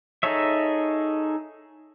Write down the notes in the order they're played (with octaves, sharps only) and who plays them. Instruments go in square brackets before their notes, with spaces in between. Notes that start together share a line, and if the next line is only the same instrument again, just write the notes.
[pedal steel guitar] D#4 G#4 A4 C#5 E5